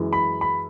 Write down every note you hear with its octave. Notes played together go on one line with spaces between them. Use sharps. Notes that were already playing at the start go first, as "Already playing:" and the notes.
Already playing: F#2 E3 G#3
B5
B5